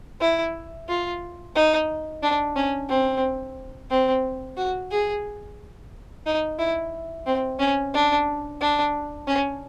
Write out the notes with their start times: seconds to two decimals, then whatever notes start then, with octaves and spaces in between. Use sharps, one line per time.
0.21 E4
0.89 F4
1.56 D#4
2.23 D4
2.56 C#4
2.89 C4
3.90 C4
4.57 F#4
4.91 G#4
6.26 D#4
6.59 E4
7.26 C4
7.59 C#4
7.94 D4
8.61 D4
9.27 C#4